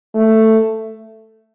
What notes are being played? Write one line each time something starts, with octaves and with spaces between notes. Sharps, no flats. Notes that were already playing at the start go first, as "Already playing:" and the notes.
A3